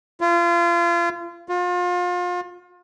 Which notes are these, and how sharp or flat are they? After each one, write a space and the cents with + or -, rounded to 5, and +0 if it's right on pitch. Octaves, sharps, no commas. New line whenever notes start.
F4 -30
F4 +35